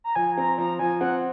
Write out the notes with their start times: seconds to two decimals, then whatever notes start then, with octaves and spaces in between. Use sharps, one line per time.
0.04 A#5
0.15 F3 G#5
0.37 C4 A#5
0.58 F3 A#5
0.79 F3 G#5
1.01 C4 F#5